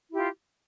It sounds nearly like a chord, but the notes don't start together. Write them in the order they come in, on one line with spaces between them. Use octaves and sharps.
E4 G4 F4